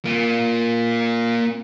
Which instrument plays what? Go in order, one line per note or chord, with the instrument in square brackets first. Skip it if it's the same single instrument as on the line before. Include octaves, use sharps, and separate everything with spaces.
[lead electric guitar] A#3 F4